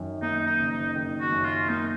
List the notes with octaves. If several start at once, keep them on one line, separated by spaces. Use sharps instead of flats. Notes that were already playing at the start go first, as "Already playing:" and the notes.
Already playing: F#2 D#3
A#3 D#4
D#4
F#1
D#4
D#3
F#4
F#2
F4
A#3 D#4